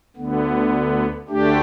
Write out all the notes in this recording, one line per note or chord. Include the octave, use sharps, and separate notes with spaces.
D2 D3 B3
D2 D3 A3 D4 G4